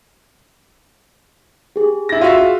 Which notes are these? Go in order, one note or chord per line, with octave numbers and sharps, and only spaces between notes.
G4 G#4
E4 A#6
F4 F#4 E5